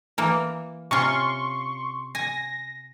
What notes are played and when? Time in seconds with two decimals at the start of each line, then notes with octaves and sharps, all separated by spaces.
0.18 E3 A#3
0.91 C3 C#4 F4 C6 C#6
2.15 G#5 A#6